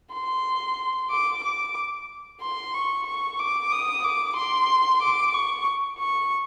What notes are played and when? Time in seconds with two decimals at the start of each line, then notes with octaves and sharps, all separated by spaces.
0.13 C6
1.10 D6
1.44 D6
2.41 C6
2.74 C#6
3.06 C#6
3.39 D6
3.72 D#6
4.04 D6
4.36 C6
5.02 D6
5.33 C#6
5.99 C#6